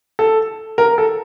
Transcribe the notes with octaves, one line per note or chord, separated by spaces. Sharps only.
A4
A#4
A4